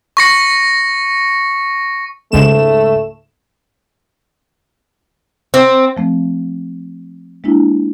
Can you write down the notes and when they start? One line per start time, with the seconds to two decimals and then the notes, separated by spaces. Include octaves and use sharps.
0.17 C#6 A#6 C#7
2.32 C#2 G#2 A3 E7
5.54 C4
5.97 F3 A3 C4
7.44 G#3 A#3 D4 E4 F4